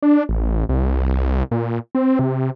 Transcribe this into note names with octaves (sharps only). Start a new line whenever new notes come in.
D4
A1
C2
A#2
C4
C3